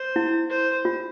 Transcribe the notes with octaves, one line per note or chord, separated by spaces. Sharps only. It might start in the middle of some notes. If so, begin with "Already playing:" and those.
Already playing: C5
E4
C5
F4